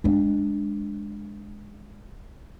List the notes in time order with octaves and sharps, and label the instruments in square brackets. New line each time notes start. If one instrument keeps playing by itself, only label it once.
[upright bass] G#3 D4